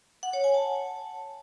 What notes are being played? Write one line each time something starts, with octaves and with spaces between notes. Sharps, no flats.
F#5
C#5
G#5
A5